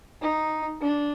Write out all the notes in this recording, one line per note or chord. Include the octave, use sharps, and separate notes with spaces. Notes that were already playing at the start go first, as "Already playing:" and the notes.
D#4
D4